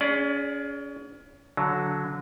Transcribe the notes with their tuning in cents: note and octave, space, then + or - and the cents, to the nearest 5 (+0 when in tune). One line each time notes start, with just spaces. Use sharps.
C#4 +30 G#4 +0 D5 +0
D3 -20 F#3 +0